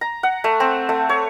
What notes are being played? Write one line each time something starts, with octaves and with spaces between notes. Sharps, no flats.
A#5
F#5
A3
C4
A3
C#5